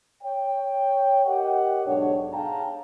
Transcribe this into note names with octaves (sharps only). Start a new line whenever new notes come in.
C#5 G5
G4 A#4 D#5 F#5
B1 G#2 D4 A4 C#5
G#4 F5 G5 A5 A#5